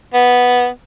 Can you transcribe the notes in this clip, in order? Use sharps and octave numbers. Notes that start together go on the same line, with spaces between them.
B3